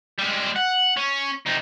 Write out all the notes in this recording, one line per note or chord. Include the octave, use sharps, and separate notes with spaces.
G3 G#3
F#5
C#4
C3 D#4